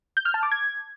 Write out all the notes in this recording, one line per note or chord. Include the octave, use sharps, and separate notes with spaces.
G6
F6
A5
D6
G#6